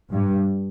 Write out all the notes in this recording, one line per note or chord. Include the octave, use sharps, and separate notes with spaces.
G2